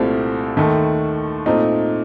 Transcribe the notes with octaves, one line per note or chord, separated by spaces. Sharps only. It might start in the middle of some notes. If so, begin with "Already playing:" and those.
Already playing: C2 A#2 A3 C4 G4
D#2 D#3 A3
A#2 A3 C4 D#4